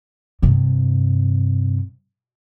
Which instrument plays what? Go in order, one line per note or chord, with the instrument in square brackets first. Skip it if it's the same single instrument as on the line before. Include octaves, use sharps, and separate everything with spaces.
[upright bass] G2 C3